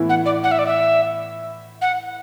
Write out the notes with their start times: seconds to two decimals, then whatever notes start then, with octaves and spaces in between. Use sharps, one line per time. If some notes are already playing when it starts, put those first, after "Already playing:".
Already playing: A2 E3 B3 E4
0.09 F#5
0.25 D5
0.43 F#5
0.51 E5
0.59 D5
0.67 E5
1.81 F#5